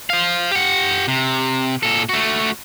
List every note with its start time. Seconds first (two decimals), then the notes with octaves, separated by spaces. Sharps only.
0.10 C5 F5
0.51 G4 F#5
1.08 C3
1.83 A#2 A4
2.09 A3 F#4